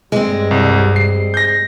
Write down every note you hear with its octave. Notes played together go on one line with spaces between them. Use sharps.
G2 G3 G#3 C4
C2
C7
G6 A#6